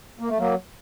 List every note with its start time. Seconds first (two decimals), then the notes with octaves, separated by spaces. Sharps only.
0.20 A#3
0.28 A3
0.38 F#3 A#3